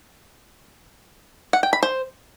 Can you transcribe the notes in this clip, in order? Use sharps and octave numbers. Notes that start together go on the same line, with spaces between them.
F#5
G5
B5
C5